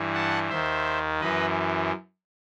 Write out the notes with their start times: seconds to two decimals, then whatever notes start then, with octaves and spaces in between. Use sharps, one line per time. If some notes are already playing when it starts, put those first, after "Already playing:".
Already playing: G2 E3
0.14 F#5 A5
0.49 D#2 D#3 C5 E5
1.20 F#2 E3 B4 D#5